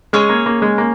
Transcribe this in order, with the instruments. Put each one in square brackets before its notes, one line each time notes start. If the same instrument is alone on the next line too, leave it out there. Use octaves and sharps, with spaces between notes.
[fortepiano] G#3 [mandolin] C#4 G#4 C#5
[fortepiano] A#3
A#3
G#3
A#3